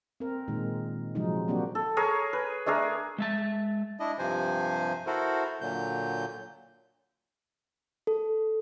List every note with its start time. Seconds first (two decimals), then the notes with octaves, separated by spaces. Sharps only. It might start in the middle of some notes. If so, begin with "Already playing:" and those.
0.20 C4 A#4
0.48 A#2 D#3 G#3
1.15 C3 F3 F#3 G#3 D#4
1.48 F#3 A#3 C4 D4 F#4 G4
1.75 A4
1.97 G#4 A#4 C#5
2.33 B4
2.66 A3 D4 G#4 A#4
3.18 G#3 E5 A5
4.00 D4 E4 D#5
4.19 G2 C3 F3 C5 G#5
5.07 E4 F#4 A4 A#4 C5
5.61 A#2 D3 F#3 G6
8.07 A4